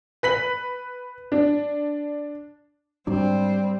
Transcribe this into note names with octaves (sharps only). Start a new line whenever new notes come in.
B4 B6 F#7
D4
G#2 F#3 G3 C4 D4